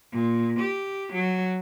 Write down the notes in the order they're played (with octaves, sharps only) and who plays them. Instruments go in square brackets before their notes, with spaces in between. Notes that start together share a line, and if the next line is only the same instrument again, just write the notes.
[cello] A#2
G4
F#3